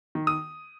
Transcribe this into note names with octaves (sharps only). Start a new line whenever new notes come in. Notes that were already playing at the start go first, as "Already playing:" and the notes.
D#3
D#6